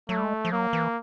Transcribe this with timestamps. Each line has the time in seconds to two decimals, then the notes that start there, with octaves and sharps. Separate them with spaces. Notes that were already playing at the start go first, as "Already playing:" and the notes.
0.09 F#3 A3
0.18 G3
0.23 G#3
0.45 F3
0.52 F#3 A#3
0.73 E3